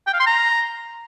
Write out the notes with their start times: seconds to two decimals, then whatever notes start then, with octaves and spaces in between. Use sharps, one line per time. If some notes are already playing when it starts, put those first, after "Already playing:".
0.07 G5
0.14 F5
0.20 C6
0.26 A#5